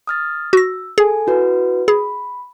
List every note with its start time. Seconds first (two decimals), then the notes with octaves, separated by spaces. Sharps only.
0.07 D#6 F6 A6
0.53 F#4 E6 A#6
0.98 G#4 A4 G#5
1.27 E4 F#4 B4
1.88 G#4 B5